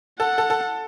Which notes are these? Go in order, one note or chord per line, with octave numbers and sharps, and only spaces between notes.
A4 F#5
A4
A4